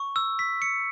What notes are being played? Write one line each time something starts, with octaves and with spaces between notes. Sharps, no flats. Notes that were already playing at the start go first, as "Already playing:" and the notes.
Already playing: C#6
E6
B6
C#7